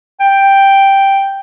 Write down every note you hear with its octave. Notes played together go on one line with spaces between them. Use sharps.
G5